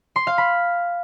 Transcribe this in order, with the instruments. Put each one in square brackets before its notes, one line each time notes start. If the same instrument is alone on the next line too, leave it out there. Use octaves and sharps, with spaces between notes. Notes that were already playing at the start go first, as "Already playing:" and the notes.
[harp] C6
F5
B5